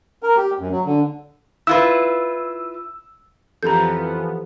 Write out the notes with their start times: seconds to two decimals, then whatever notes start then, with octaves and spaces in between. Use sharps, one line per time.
0.23 A#4
0.37 G4
0.59 F#2
0.71 F#3
0.86 D3
1.67 E4 F4 B4 E6
3.63 F2 E3 F3 B3 G4 A4 A#5 G6